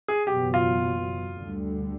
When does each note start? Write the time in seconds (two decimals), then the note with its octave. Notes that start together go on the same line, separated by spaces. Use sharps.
0.08 G#4
0.27 F#1 E2 B2 F#3 B3 G4
0.54 F4
1.34 D2 D3 G3